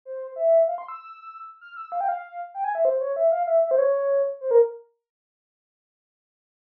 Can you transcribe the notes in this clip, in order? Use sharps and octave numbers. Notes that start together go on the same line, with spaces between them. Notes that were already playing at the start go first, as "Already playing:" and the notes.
C5
E5
F5
C6
E6
F6
E6
F5
G5
F5
G5
G#5
E5
C5
C#5
E5
F5
E5
E5
C5
C#5
C5
A#4